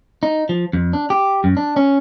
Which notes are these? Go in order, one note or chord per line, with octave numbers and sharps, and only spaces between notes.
D#4
F3
F2
D4
G4
F#2
D4
C#4